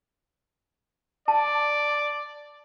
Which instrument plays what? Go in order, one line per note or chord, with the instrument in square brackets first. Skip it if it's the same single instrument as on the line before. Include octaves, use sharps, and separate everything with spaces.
[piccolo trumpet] D5 [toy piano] A5